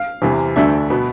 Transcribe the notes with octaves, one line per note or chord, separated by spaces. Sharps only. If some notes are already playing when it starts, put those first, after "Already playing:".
Already playing: F5
E2 C3 E3
D2 D3 A3 D4 E5
B2 B3